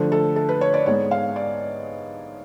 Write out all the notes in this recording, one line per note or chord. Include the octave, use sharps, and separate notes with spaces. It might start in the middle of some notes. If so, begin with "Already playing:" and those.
Already playing: D3 F3 A3
A4
A4
B4
C#5
D5
G#2 G#3 B3 C#5
F5
D5